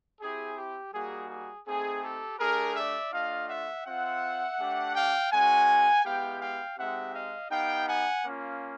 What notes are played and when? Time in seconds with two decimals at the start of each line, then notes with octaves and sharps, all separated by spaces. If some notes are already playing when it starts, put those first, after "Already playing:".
0.21 C4 E4 G4 G#4
0.57 G4
0.94 G3 A#3 D#4 F#4 G#4
1.30 G#4
1.67 A3 C4 D#4 G#4
2.03 G4 A4
2.39 A3 D4 G4 G#4 A#4
2.76 D5 E5
3.13 A3 D4 F4 D#5 F5
3.49 E5 F#5
3.86 C4 F4 E5 F#5
4.59 A3 D4 G4
4.95 F5 G5
5.31 G#3 C#4 F#4 F#5 G#5
6.04 G#3 B3 E4 G4 F5 G5
6.41 F5 G5
6.78 G#3 C4 D#4 G4 E5 F#5
7.14 D#5 F5
7.51 B3 D#4 G4 F5 G5
7.87 F#5 G#5
8.23 A#3 C#4 F4